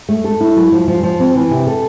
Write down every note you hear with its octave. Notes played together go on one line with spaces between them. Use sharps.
A3
A4
E4
F#3
F3
F3
F3
C4
E3
C3
A4